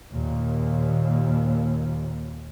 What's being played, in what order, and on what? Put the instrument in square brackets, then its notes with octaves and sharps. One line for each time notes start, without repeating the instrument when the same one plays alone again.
[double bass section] D#2 A#2